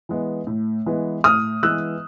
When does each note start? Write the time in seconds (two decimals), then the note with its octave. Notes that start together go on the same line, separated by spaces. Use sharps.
0.09 E3 G#3 B3
0.47 A2
0.86 E3 G#3 B3
1.24 A2 D#6 F6
1.63 E3 G#3 B3 E6 F#6